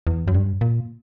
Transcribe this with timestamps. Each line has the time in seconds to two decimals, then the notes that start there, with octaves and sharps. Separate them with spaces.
0.07 E2
0.28 F#2
0.34 G2
0.61 A#2